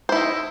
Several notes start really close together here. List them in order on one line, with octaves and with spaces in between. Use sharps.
C5 E4 D#4